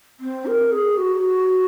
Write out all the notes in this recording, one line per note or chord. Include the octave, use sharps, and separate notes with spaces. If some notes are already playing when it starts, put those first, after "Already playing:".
C4
A#4
G#4
F#4